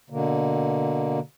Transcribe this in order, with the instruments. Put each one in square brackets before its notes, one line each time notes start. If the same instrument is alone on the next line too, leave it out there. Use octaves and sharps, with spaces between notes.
[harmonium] B2 D3 A#3